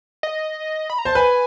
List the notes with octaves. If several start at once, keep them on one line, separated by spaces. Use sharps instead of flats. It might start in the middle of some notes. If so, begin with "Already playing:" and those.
D#5
B5
A#5
C5 A5
B4 G#5